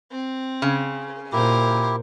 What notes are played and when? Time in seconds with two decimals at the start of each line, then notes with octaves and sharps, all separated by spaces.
0.11 C4
0.62 C#3
1.32 A#2 E4 G4 A#4 C5